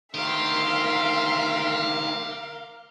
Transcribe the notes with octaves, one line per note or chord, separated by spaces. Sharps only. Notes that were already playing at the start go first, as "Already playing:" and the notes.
D2 D#3 G4 A#4 E5 F5 C6